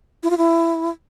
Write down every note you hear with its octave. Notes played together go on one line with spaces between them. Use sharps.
E4
F4
E4